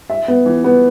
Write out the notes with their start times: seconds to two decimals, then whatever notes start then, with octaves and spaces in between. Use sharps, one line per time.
0.10 E5
0.28 B3
0.46 E3
0.64 B3